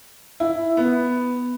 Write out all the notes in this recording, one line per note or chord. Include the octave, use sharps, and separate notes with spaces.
E4
B3